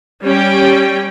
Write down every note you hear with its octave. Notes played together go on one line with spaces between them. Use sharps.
G3 C#4 G5